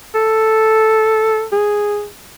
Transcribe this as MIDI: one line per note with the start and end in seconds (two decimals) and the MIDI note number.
0.15 1.45 69
1.52 2.06 68